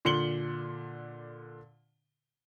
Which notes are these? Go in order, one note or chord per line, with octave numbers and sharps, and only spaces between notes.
A#2 D3 C6 C#7 F#7 G7